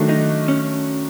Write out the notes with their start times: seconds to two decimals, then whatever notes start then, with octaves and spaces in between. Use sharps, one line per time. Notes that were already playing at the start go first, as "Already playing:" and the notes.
Already playing: D#3 F#3 A3 D4 F#4
0.09 D#4
0.48 C#4